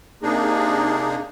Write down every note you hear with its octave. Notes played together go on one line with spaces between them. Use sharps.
C3 A#3 D4 D#4 G#4